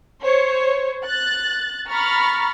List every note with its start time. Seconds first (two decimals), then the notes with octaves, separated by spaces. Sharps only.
0.24 C5 C#5
1.05 F#6 A6
1.88 A#5 B5 C#6 F6 A6